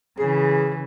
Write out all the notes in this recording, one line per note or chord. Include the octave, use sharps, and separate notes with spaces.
C#3 E3 G#4